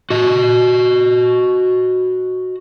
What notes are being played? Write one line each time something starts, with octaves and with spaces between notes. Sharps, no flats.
F#4 D#5